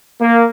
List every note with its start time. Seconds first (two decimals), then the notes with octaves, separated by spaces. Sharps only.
0.20 A#3